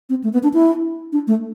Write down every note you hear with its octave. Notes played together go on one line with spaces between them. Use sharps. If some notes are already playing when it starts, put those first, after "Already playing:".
C4
A3
B3
D4
E4
D4
A3